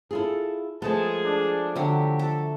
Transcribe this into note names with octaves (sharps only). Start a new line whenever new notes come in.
E4 F4 G#4 A4
F3 G#3 A3 B3 G#4 A5
D4
D3 F#3 F#4 G4 E5
A4